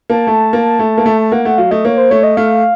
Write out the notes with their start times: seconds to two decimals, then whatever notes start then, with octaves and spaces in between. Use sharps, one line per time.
0.10 A#3 A5
0.27 A3
0.53 A#3
0.79 A3
0.98 A#3
1.06 A3
1.21 A5
1.32 A#3 F#5
1.45 A3 F#5
1.58 F#3 F5
1.71 A3 D#5
1.85 A#3 C#5
1.98 C5
2.11 A3 C#5
2.23 D#5
2.37 A3 F5